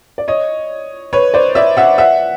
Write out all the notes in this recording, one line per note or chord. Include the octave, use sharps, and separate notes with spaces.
D5
C#5 D#5
B4 C#5
C5 D5
D5 E5
E5 F#5
E5 F#5